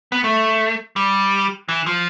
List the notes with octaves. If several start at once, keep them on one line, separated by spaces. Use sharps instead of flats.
B3
A3
G3
E3
F3